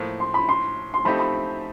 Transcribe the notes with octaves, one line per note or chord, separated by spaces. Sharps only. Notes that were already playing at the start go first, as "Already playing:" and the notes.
Already playing: A2 F3 A#3
C6
B5
C6
C6
F3 A3 C4 D#4 G4 B5
B5